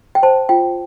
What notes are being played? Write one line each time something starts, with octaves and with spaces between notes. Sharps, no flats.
G5
C5 A5
F4 G5